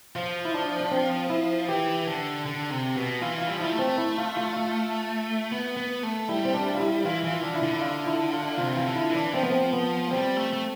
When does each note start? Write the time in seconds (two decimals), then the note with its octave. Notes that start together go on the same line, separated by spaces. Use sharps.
0.16 F3 F4
0.45 E4
0.54 D4
0.80 D4
0.91 C4
1.30 E4
1.68 E3 G4
2.07 D3
2.46 D3
2.70 C3
2.97 B2
3.22 E3 F4
3.42 F4
3.47 G3
3.57 F3
3.61 G3 E4
3.72 A3
3.79 C4
3.98 E4
4.18 F4
4.37 F4
4.56 F4
5.52 B3
5.77 B3
6.03 A3
6.29 G3 E4
6.45 C4
6.54 D4
6.75 F4
6.80 E4
7.05 E3 F4
7.24 E3
7.30 F4
7.42 D3
7.55 E4
7.63 D3
7.77 E4
7.81 F4
8.07 E4
8.33 F4
8.58 C3 F4
8.74 E3 F4
8.84 D3
8.96 E4
9.10 E3
9.15 D4
9.34 F3 C4
9.43 B3
9.50 C4
9.73 B3
10.11 G3 C4
10.36 A3
10.53 A3